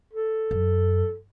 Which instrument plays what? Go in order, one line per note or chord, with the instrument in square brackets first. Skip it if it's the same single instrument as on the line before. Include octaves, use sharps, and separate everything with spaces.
[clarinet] A4
[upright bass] F#2